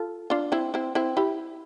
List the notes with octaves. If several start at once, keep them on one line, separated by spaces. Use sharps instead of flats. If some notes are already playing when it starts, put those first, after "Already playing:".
Already playing: F4 A4
D4 F4
C4 E4
C4 E4
C4 E4
E4 G4